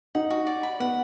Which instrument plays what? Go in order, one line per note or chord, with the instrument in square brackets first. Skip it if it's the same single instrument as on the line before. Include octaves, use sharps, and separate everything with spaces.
[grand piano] D#4 [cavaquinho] F#5
[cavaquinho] F#4
D5
B5
[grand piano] B3 [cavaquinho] F#5